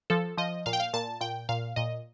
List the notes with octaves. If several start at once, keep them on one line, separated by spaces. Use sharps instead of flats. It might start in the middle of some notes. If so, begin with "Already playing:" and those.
F3 A4
F3 D#5
A#2 F5
G5
F5
A#2 A5
A#2 G5
A#2 F5
A#2 D#5